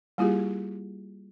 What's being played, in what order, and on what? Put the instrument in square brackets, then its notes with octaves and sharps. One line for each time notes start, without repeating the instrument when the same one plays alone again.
[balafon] G3 A#3 E4 F4 G4 G#4